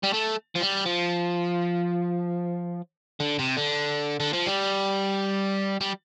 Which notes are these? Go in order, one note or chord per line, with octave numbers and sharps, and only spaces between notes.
G3
A3
F3
G3
F3
D3
C3
D3
D3
F3
G3
G3